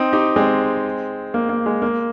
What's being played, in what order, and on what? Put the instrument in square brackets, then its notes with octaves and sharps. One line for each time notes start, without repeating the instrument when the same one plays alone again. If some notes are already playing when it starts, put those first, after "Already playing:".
Already playing: [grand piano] C4 D#4
D#4 G4
G#3 C4
A#3
A#3
G#3
A#3